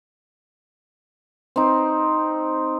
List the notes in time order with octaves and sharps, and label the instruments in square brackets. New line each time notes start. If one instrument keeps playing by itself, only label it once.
[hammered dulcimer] C4 D#4